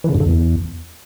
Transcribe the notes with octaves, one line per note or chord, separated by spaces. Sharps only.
E3
C#3
G2
D3
E2